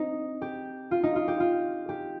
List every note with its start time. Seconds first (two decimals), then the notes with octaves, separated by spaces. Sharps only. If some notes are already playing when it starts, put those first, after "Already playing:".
Already playing: C4 D#4
0.42 G4
0.91 F4
1.03 D#4
1.16 F4
1.28 G4
1.40 F4
1.89 G4